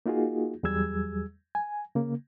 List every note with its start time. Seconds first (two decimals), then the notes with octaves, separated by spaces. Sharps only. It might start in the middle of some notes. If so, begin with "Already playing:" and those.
0.06 A#3 D#4 F4 F#4 G#4
0.63 E2 F#3 G3 G#4 E6 G#6
1.55 G#5
1.95 C#3 A#3